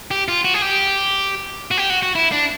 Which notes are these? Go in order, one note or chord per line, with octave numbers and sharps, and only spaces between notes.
G4
F4
F#4
G#4
G4
F#4
G4
F#4
F#4
E4
D4